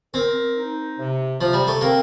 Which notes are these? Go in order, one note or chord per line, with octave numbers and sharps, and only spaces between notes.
C4 A#4
D#4
C3
C3 F3
G3
A3
A#3 C4